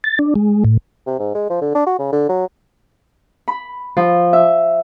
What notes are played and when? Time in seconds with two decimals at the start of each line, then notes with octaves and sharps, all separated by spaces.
0.04 A6
0.19 D4
0.36 G#3
0.64 A2
1.06 C3
1.19 G#2
1.35 G#3
1.50 F3
1.61 D3
1.75 D4
1.86 F#4
1.99 C#3
2.12 D3
2.29 F#3
3.48 B5
3.97 F3
4.33 E5